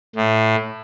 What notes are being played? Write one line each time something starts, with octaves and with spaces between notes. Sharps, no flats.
A2